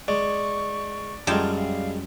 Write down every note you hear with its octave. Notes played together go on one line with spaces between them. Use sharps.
G#3 D5 C#6
F#2 G3 G#3 F4 G5 A5
F5